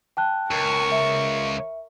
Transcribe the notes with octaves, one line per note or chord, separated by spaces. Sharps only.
G5 A5 F#6
C#2 A#4 C#6
E5